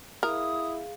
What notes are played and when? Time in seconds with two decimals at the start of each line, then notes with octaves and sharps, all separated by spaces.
0.23 E4 G#4 A#4 F5 D#6